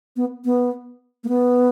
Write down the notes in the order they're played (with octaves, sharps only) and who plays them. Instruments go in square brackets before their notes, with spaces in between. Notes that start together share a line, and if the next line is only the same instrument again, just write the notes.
[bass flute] B3
B3
A#3
B3